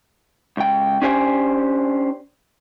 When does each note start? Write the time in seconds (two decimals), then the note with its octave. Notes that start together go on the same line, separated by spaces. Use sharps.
0.57 C#2 G5
1.02 C#4 D4 G4 C5 E5 G#5